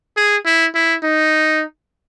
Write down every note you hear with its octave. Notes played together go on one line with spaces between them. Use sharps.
G#4
E4
E4
D#4